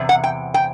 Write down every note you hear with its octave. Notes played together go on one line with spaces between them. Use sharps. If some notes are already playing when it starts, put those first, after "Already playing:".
Already playing: E2 C3
F#5
G5
G5